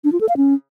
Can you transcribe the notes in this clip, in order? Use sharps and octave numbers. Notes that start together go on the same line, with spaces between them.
D4
F4
A4
F5
C#4